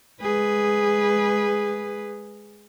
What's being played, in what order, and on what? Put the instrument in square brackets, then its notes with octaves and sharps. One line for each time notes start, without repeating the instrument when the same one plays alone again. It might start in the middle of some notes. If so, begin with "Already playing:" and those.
[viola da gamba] G#3 G#4 B4